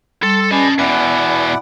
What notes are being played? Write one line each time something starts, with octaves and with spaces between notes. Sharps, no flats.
G3 A4 C6
C#4 G#4 B4 D5 D#5 A5
E2 B2 E4 D5 F#5 G#5